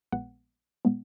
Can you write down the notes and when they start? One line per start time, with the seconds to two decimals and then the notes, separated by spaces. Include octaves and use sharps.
0.12 A#1 A#2 G#3 B3 F#5
0.85 A#2 G#3 B3